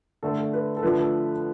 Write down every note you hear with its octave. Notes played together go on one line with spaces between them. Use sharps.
D3 A3 A4
A4
B4
A4
D3 F3 A3 B4
A4